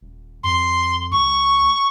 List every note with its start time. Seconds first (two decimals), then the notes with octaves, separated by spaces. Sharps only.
0.01 D#1
0.44 F2 C6
1.12 C#2 C#6